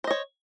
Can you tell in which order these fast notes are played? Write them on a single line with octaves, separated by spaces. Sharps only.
C5 D#5 C#5